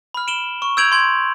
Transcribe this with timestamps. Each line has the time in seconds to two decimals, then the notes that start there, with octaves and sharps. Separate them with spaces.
0.14 B5 F6
0.28 D7 E7 F#7 G7
0.62 C#6
0.77 E6 G6 G#6 D7 F7 F#7
0.92 C6 G#6 D7 F#7